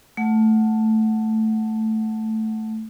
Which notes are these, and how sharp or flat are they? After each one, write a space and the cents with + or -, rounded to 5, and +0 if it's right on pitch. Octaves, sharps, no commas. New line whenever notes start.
A3 +0 F#5 +0 A5 +0